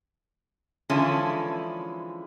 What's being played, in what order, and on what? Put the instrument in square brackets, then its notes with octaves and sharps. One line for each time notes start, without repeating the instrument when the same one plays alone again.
[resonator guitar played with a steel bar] D3 E3 F3 G#3 C#4 E4